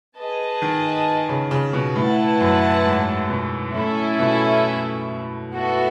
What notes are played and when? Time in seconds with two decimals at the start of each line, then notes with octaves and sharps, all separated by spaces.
0.18 G#4 B4 D#5 A5
0.62 D#3
1.29 C#3
1.51 C#3
1.73 B2
1.96 A2 E4 B4 F#5 A5
2.40 F#2
2.85 G#2
3.29 B2
3.74 A2 C#4 E4 A4 E5
4.19 B2
5.53 B3 F#4 A4 E5